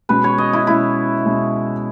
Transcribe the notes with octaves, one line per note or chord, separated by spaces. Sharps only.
B2 G#3 C#4 B4
C#5
D#5
E4
B2 G#3 C#4 E4
B2 G#3 C#4